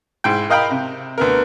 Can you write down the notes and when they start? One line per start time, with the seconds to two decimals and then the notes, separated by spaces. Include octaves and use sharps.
0.24 G#2 E4 G5
0.50 A#4 D#5 F5 G5 A#5 B5
0.71 C3
1.18 D2 B3 A#4